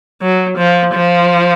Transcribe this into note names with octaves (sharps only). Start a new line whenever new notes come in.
F#3
F3
F3